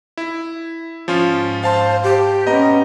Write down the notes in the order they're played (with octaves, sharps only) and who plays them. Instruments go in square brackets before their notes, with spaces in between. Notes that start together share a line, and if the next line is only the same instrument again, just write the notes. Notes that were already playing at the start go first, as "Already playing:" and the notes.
[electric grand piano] E4
[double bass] G#2 [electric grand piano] F3 C#4 F4
[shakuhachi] C5 [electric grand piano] F5 A5 C6
[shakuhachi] G4
[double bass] B3 C#4 [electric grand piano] D#5 A#5